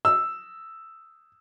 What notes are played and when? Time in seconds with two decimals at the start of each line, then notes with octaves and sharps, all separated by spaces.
0.05 E6